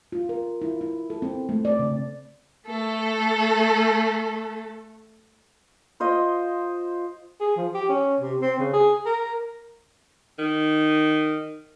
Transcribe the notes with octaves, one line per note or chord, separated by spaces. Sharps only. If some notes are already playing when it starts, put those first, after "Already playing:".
F4
A#4
E4
E4
A4
C4
A3
D5
C#3
A3 A4
F4 C5 D#5
G#4
F3
G4
C#4
C3
C4
C#3
G#4
A#4
D#3